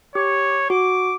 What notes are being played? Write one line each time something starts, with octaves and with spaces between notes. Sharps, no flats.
G4 C#5
F#4 D6